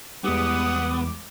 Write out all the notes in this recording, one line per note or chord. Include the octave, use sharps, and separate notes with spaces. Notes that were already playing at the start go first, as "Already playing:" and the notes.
E2 G3 G#3 B3 F#5 D6 D#6